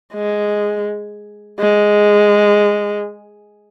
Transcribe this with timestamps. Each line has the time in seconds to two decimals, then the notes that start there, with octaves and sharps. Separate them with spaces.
0.14 G#3
1.59 G#3